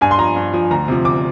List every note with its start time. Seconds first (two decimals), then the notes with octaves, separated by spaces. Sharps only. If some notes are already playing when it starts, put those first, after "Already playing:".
0.01 G2 G#5
0.11 C6
0.18 F3 A#5
0.36 G2
0.54 F3
0.71 D2 A#5
0.88 C3 F3
1.04 D2 D6